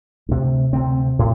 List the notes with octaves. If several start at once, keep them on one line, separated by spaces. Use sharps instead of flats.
D2 C3
D2 C3 C4
A2